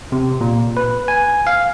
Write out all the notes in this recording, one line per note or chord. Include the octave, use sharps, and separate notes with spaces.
C3
A#2
B4
G#5
F5